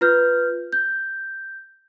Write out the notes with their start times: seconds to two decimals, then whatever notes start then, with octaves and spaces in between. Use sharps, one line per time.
0.01 F4 B4 F6 G6
0.73 G6